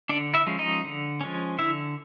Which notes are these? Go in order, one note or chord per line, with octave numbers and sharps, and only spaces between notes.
D3 D4 D5
E4 E5
F3 G#3 C#4
D#4 D#5
D3
F3 G#3 C#4
D3 E4 E5